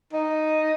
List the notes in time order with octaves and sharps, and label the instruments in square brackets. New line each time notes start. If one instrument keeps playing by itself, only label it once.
[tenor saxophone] D#4